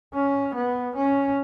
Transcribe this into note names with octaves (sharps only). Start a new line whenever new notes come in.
C#4
B3
C#4